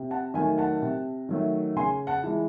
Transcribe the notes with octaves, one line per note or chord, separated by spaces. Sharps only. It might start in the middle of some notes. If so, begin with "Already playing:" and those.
Already playing: C3
F#5 A5
D#3 F#3 A3 E5 G#5
F#5 A5
C3
D#3 F#3 A3
C#3 G#5 C6
F#5 A5
E3 G#3